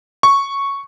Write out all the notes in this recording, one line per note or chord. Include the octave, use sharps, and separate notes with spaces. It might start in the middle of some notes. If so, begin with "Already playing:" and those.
C#6